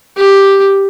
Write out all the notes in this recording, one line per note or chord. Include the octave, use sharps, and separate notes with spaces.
G4